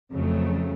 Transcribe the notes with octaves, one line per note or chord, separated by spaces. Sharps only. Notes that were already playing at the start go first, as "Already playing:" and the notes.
F2 C#3 F#3 A3